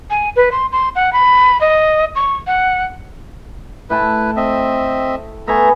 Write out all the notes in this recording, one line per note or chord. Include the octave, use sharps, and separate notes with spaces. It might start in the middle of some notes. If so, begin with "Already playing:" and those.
G#5
B4
C6
C6
F#5
B5
D#5
C#6
F#5
A2 E4 B4 G5 A5
C4 D#5 E5
A3 B3 E5 G#5 A#5 B5